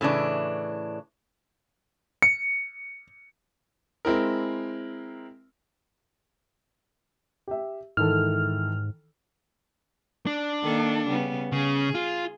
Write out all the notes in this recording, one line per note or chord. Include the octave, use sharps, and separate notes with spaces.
A2 C#3 E3 D4
C#7
G#3 C4 E4 A#4
G4 E5
G#2 D#3 E3 A4 F6
D4
D#3 A#3 A4
C#3 G3 B3
C#3 G#4
F4